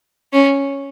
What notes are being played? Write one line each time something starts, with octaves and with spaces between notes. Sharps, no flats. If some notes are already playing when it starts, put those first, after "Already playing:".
C#4